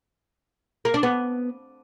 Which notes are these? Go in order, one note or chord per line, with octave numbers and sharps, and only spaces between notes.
A#3
D4
B3